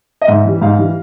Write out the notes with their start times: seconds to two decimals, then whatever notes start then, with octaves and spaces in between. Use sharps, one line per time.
0.21 D#5
0.27 G#2 E5
0.45 E3 G3
0.62 G#2 F5
0.78 E3 G3